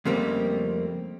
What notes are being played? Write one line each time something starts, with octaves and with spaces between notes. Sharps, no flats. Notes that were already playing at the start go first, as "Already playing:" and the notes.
F2 C#3 G3 A3 A#3 C4